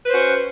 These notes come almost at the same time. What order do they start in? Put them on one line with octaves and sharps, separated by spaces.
B4 C5 F#4 C#4